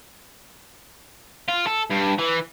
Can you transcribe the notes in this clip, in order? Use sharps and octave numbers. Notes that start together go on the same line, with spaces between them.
F4
A4
G2
E3